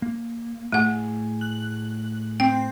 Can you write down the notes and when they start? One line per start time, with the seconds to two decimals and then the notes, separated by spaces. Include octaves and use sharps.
0.02 A#3
0.72 A2 A3 G#4 F#5 G#5
1.41 F#6 F#7
2.40 C4 G5